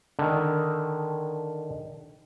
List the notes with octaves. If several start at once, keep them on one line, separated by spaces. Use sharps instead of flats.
D3 D#3